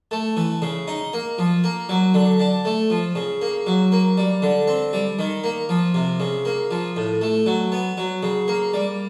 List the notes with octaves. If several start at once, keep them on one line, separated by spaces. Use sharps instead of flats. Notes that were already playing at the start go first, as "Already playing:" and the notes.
A3
E3
C#3
D#4
A#3
F3
A#3
F#3
D3
D4
A3
F3
C#3
A#3
F#3
A#3
G3
D3
C4
G3
D#3
A#3
F3
C3
C#3
A#3
F3
A2
A3
F#3
B3
F#3
C#3
A#3
G3